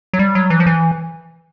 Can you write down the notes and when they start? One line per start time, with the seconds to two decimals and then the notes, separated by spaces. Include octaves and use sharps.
0.13 F#3
0.19 G3
0.35 F#3
0.50 E3
0.60 F3
0.66 E3